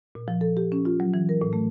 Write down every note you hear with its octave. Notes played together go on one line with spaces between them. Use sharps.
A#2
F3
A4
G4
C#4
F4
F#3
E3
A#4
A2
A3